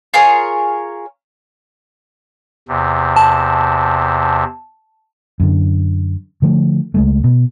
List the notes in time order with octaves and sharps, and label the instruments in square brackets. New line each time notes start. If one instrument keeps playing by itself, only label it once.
[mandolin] F4 G#4 A#4 C#5
[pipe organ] E2 C3
[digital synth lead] A5
[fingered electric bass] F#2 D3
D3 F3 A3
C#2 G#3 A3
B2